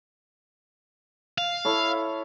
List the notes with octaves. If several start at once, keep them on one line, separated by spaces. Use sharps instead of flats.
F5
E4 A4 C#5